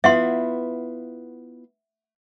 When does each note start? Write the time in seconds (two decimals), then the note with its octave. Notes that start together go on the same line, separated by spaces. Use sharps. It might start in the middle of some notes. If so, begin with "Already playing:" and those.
0.04 B3 E4 F4 E5 F#5 C6